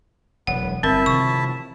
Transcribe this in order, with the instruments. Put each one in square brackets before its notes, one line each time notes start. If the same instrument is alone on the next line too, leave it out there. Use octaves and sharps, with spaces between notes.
[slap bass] E1 F#3 [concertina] B3 [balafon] F#5
[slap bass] G1 [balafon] C4 A#4 [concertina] E4 E5 A5
[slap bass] C3 D#3 F3 [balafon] C#6